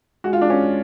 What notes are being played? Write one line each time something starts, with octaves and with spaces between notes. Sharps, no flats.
G#3 F#4
F4
G#3 D4
C#4